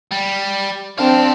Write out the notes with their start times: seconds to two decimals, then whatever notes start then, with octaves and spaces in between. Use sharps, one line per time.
0.12 G3
0.98 C4 D4 F5 A5